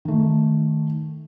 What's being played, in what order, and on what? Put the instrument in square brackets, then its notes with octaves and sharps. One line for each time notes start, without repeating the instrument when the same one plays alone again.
[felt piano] D#3 A3